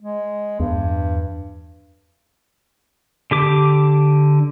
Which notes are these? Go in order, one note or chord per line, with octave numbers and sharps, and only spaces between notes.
G#3
E2 G2
D3 G4 D6